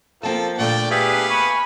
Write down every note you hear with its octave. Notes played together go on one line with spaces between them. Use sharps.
F3 A#3 C4 A4 A5
A#2 D3 A3 D5 G5
B3 D4 G4 G#4 B4 E5 F5
G#5 B5 C#6